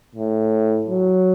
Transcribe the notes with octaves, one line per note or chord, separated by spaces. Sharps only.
A2
F#3